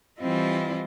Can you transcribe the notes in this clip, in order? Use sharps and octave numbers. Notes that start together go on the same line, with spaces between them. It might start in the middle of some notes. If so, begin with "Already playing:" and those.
E3 G3 C4 E4 F4 D#5